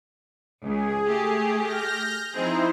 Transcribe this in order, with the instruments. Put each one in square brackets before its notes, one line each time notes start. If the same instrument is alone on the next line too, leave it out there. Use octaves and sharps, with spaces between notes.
[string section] C#2 [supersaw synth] G#4
[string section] A3 G4
[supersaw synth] F6 G6 A#6
[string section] F3 C4 G#4 [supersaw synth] D#4 E4 C5